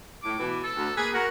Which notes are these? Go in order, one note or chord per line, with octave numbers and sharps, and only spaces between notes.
A2 D6
B2 E3
A4
D2
A#3 G#4 B4
F#4 A#4 F#5